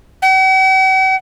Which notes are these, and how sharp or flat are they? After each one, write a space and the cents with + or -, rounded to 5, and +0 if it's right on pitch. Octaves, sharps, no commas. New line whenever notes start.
F#5 +45